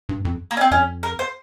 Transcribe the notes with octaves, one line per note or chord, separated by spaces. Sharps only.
G2
F2
A#3
C#4
C4
F2 C#4
A#4
C5